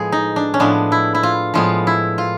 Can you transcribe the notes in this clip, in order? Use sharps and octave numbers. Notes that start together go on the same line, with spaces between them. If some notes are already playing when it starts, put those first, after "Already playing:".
Already playing: A2 F3 G#3 B3 G#4
D#4
D4
C#4
A2 F3 G#3 B3 D4
E4
E4
F4
A2 F3 G#3 B3 F4
E4
F4